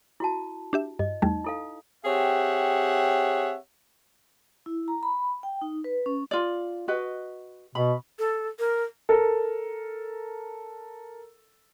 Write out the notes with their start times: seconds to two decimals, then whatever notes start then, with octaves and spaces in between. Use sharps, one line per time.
0.20 E4 F#4 A5
0.73 D4 G4 E5
0.99 G2 D#5
1.22 E2 G3 A3 D#4
1.44 E4 A4 F5
2.05 C4 G4 G#4 C#5 E5 F#5
4.66 E4
4.88 A#5
5.03 B5
5.43 G5
5.62 D#4
5.84 B4
6.06 C#4
6.31 F4 D5
6.88 F#4 B4 D#5
7.75 B2 B5
8.19 A4
8.59 A#4
9.09 A4 A#4